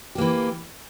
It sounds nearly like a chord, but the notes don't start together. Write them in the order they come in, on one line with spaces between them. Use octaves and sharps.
G4 A#3 E3